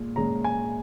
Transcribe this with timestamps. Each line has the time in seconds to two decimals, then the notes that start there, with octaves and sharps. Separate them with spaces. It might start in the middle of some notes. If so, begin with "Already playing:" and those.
Already playing: A#2 G#3
0.16 A#2 G#3 C#4 A#5
0.44 G#5